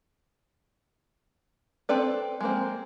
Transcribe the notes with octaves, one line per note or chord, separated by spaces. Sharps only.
C4 A4 B4 D5
G#3 A#3 C4